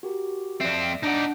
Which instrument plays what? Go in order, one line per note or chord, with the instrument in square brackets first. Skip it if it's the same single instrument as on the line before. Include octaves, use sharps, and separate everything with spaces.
[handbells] F#4 G4 A#4
[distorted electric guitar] F2 C4 [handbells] D5 E5
[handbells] D4 F#5 [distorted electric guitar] D#4 D5